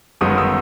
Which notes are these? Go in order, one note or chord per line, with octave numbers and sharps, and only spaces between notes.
G1 F#2 D#3 G#3 B3 D#6
E6